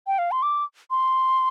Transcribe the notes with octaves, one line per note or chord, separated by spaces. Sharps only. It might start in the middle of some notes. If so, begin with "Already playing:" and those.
G5
F5
C6
D6
C6